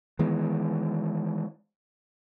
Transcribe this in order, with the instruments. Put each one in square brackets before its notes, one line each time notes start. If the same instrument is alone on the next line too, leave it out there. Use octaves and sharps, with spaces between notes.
[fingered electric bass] D#3 E3 G#3 B3